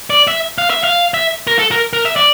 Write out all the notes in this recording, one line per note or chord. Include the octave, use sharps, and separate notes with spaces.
D5
E5
F5
E5
F5
E5
A#4
A4
A#4
A#4
E5
D5